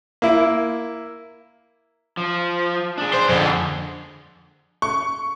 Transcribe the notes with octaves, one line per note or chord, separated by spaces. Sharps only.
A#3 E4
F3
D4 G#4
C5
F2 D3
C#6